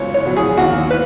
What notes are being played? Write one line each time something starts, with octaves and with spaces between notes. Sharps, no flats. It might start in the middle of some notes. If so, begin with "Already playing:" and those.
Already playing: C#2 F#3 C#5
C#5
B2 F#3
G#4
D#2 F#4
B4